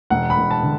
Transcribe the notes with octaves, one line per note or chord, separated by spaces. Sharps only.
E1 F#5
B5
E1
A5
D3